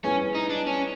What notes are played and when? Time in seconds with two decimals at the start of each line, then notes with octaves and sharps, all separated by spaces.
0.04 G3 B3 C#4 E4 G#4 B4
0.35 D#4
0.50 D4
0.67 C#4